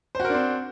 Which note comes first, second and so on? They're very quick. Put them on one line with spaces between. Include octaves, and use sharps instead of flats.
C5 F#4 A#4 D4 C4